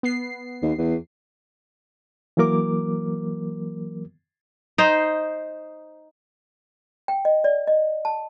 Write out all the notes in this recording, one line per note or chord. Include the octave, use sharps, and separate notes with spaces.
B3 C7
D#2
E2
E3 F#3 A#3 A#4 D6
D#4 C5
G5
D#5
D5
D#5
A5